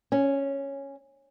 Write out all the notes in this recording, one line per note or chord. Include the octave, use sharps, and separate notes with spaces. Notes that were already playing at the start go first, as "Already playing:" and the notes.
C#4